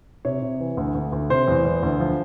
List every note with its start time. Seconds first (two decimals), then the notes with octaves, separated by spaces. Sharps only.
0.25 C3 C#5
0.42 C3
0.60 E3
0.77 D2
0.95 D2
1.12 D2
1.30 C3 C5
1.48 E2
1.65 E2
1.83 D2
2.00 F3